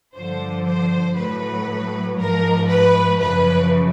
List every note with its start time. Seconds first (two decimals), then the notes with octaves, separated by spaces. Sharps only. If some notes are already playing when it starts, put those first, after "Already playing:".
0.14 G2 D3 F3 C5
0.65 C5
1.16 A2 F#3 B4
2.17 G#2 F3 A#4
2.68 B4
3.20 F#2 C#3 F3 B4